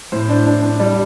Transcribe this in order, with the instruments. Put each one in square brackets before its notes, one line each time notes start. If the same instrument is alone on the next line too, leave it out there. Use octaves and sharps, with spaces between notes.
[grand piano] A2 C5
D4
D4
D4
G3 D5